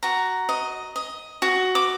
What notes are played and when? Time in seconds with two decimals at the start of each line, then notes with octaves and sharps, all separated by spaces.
0.03 F#4 A#5
0.49 D#5
0.96 D#5
1.42 F#4
1.75 D6